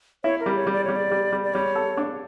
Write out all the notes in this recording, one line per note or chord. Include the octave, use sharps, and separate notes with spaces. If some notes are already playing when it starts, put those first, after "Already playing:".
E4 C#5
A#4
G3
C#5
G3
D5
G3 C#5
D5
G3
G3
D5
G3 C#5
A4
D4